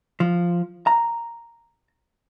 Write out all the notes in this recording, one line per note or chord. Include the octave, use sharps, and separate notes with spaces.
F3
A#5